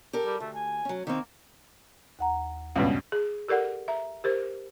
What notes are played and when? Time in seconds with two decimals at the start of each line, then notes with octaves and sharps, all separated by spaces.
0.13 G4 A4 A#4
0.25 G3
0.40 D2 A3
0.55 G#5
0.85 F#3 C#4
1.07 D#3 A#3 C4
2.19 D#2 F#5 A#5
2.76 C#2 G2 B2 C#4
3.12 G#4
3.48 G4 A4 A#4 D5 F#5
3.88 E5 A#5
4.24 G4 A#4 C5